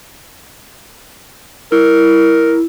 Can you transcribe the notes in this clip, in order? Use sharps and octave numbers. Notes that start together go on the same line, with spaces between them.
E4 A#4